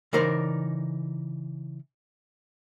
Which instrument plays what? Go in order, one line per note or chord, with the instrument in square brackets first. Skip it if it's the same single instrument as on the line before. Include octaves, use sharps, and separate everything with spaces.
[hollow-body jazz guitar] C#3 E3 D#4 A#4 C5 D5